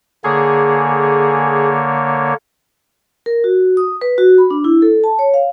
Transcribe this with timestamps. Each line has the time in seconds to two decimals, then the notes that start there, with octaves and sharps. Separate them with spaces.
0.24 D3 A#3 G#4 C#5
3.26 A#4
3.44 F#4
3.77 D#6
4.02 B4
4.18 F#4
4.38 B5
4.51 D4
4.64 E4
4.82 A4
5.04 A5
5.19 C#5
5.34 F5